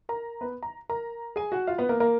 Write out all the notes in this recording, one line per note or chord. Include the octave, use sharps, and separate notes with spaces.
A#4 A#5
B3 B4
A#5
A#4 A#5
G#4 G#5
F#4 F#5
F4 F5
B3 B4
A#3 A#4
A#3 A#4